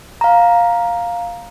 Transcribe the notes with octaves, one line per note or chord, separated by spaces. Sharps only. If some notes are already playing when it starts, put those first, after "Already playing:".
F5 A#5